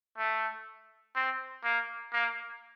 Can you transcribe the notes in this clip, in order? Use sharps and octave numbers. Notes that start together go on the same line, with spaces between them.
A3
C4
A#3
A#3